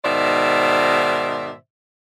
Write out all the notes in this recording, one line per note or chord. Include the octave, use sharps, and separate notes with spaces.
G#2 B2 D#3 C5 D5 E5